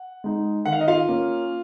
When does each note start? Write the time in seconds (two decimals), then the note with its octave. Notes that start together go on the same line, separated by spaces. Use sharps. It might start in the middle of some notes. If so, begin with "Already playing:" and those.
Already playing: F#5
0.24 G#3 D#4
0.65 D#3 F#5
0.72 F5
0.81 D#5
0.88 F4 F5
1.09 A#3 C#4